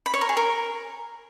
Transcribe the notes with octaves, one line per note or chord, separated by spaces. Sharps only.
B5
C#5
A#4
G#4
A#4